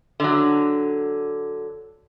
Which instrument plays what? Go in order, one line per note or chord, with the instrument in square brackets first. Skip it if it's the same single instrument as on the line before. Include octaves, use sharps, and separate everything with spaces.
[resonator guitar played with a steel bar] D3 F#3